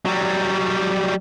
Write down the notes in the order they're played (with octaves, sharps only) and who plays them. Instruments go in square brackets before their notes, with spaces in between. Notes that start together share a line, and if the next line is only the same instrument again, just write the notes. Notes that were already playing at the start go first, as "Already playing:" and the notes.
[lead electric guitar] F#3 G3